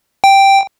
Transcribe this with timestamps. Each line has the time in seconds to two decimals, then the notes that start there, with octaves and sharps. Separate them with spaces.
0.24 G5